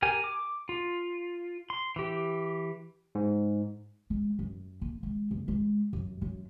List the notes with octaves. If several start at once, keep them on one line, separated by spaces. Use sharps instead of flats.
G4 A#4 G#5
D6
F4
C6
E3 G4
G#2
G#3
F#2
A#3
G#3
F#1
G#3
F#2
F#2